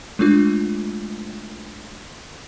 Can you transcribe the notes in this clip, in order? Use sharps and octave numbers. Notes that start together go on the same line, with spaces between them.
G#3 A3 D4 F4